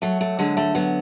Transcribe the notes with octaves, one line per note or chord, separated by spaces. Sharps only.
F#3 A3
A3
D3 G#3
A3
F#3 B3